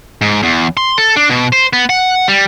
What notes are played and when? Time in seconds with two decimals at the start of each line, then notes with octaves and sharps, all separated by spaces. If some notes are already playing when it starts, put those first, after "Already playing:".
0.21 G#2
0.43 E2
0.77 C6
0.98 A4
1.16 D4
1.30 B2
1.53 C5
1.73 B3
1.89 F#5
2.28 G3